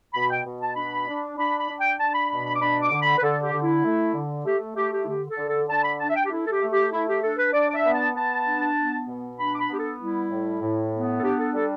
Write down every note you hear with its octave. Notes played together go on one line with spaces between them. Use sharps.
B2 B5
G5
B2
A5
D4 B5
D4
D4 B5
B5
D4
G5
D4 A5
B5
B2 B5
B5
D6
D4 B5
D6
D3
B5
B4
D3 A4
G4
D3
E4
A3
D3
A3 G4
A3 G4
G4
E4
D3 G4
A4
D3
A4
D3 A5
B5
D4 A5
E5
G5
G4
A3 E4
A4
G4
A3
G4
A3 E4
G4
D4 A4
B4
D4 D5
D5
E5
B3
A5
B3 A5
D4
B3
B2
D4 B5
D6
B5
B3 G4
A4
G3 E4
A2
A2
B3
A4
D4 G4
A4
G3 A4